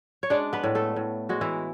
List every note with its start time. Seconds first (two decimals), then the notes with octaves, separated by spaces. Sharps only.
0.23 C#5
0.30 G#3 D4 D5
0.53 B3 B4
0.64 A2
0.75 A3 A4
0.96 A2
1.29 G#3 F#4
1.41 E3 E4